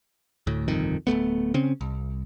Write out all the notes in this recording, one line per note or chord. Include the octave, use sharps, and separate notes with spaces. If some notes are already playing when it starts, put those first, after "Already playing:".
D2 A2
G1 C2 F2 D#3
D1 C#2 A3 B3
C#3 C4 C#4
C2